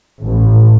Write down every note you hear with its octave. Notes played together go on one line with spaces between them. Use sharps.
A1